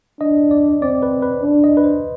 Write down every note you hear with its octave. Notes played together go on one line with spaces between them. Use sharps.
D4 D#5
D5
C4 D5
B4
B4
D4
D#5
B4
C5